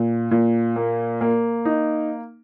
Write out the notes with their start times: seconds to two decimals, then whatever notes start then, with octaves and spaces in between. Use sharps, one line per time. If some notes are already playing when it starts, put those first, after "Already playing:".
Already playing: A#2
0.31 A#2
0.76 A#3
1.21 A#3
1.65 D#4